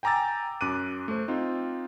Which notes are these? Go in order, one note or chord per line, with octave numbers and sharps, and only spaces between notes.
G5 G#5 A#5 D6 E6 A6
F#2 D6 F#6 D#7
A3 C5
C4 D#4 F4